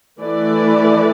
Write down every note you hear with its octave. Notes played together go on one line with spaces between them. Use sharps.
E3 A3 E4 B4 D5